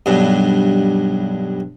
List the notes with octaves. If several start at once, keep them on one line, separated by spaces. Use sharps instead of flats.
B1 G2